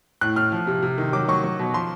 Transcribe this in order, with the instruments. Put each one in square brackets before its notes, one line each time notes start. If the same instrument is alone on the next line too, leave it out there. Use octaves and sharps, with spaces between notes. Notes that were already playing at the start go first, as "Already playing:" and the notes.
[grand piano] A2 F#6
A2 F6
F3
C3
C3
D#3
F#3 D6
F#3 C#6
F#3
B2
F3 C6